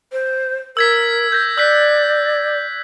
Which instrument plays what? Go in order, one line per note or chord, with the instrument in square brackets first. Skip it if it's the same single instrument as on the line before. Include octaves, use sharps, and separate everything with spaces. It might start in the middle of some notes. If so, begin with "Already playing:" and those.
[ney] C5
[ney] A#4 [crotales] E6 G#6 B6
[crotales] G6 A#6
[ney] D5 [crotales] E6 F#6 B6